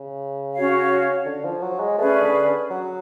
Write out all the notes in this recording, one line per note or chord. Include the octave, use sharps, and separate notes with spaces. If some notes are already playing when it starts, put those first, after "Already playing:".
Already playing: C#3
C#4 F#4 C#5 F5
D3
F3
F#3
G#3
A3 C#4 G#4 B4 D5
D3
F#3